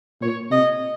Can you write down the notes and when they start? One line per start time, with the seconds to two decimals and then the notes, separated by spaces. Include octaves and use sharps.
0.21 A#2 C#5
0.51 C3 D#5